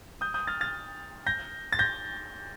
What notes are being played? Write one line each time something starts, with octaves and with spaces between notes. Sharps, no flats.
D#6 G6
D#6 G6
F6 A6
F6 A6
G6 A#6
A6
G6 A#6